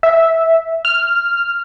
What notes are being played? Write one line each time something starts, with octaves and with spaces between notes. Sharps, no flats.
E5
F6